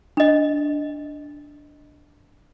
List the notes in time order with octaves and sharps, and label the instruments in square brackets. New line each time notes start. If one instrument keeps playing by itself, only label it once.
[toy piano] D4 D#5